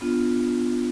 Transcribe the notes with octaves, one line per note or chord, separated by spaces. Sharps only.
B3 D4 F4